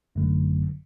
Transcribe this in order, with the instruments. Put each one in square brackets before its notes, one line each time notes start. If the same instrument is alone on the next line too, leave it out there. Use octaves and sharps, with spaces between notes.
[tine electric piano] G#1 F#2 D3 F#3 A3